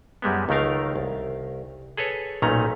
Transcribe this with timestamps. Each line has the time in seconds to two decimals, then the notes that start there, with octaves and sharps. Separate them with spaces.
0.22 F#2 G3 G#3 B3
0.49 C#2 D#3 A3 A#4 F5
0.96 C2
1.97 G#4 A4 B4 C#5
2.42 B1 A#2 D#3 A3 C#4 A#5